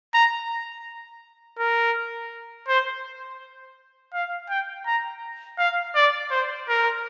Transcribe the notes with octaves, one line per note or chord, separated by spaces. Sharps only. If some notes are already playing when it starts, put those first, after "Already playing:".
A#5
A#4
C5
F5
G5
A#5
F5
D5
C5
A#4